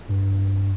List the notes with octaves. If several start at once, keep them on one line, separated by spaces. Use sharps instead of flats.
G2